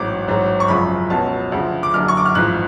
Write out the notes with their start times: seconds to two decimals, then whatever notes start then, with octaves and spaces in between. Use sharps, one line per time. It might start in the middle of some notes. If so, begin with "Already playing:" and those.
Already playing: A1 G#2 F#3 D6
0.27 A1 G#2 F#3
0.60 C#6
0.68 G#1 F#2 C#3 F3 B5
1.10 C#2 B2 F#3 A5
1.52 D2 C#3 F3
1.83 D6
1.94 F#1 F#2 D3 F6
2.08 C#6
2.17 D6
2.26 F6
2.35 A1 G#2 F3 F#6